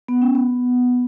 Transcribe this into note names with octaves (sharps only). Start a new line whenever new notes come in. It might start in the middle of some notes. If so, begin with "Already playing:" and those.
B3
C#4
B3